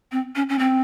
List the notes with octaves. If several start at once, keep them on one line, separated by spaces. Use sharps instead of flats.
C4
C#4
C#4
C4